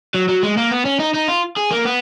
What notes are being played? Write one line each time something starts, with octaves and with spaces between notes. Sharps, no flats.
F#3
F#3
G#3
A#3
B3
C#4
D#4
D#4
F4
G#4
A#3
B3